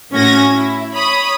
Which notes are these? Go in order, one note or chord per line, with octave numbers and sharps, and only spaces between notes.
A2 C#4 F#4 G#6 A#6
E4
C#5 B5 D#6